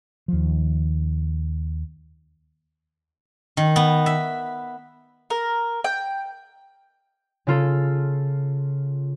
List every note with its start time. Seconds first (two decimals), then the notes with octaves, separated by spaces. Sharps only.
0.28 D#2 F3
3.57 D#3
3.76 B3
4.06 E5
5.30 A#4
5.84 G5
7.47 C#3 F4 A4